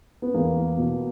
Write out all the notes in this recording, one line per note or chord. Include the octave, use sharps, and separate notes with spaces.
B3
E2 A#3
B2